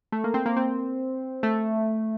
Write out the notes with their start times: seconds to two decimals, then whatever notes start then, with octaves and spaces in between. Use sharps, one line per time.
0.12 A3
0.24 A#3
0.34 C4
0.46 A#3
0.57 C4
1.43 A3